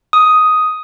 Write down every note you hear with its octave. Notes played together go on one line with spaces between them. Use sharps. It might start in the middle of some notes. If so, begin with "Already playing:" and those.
D#6